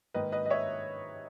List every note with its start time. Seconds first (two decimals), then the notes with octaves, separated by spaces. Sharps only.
0.14 G#2 D#3 A#3 B4 D#5
0.32 B4 D#5
0.46 D#5
0.50 C#5 E5